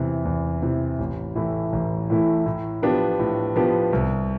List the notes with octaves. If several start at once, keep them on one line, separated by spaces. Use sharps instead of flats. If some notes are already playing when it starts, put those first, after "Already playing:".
Already playing: E2 C3 E3
E2
C3 E3
A1
A2 E3 A3 E4
A1
A2 E3 A3 E4
A2
F3 B3 D4 G4
A2
F3 B3 D4 G4
C2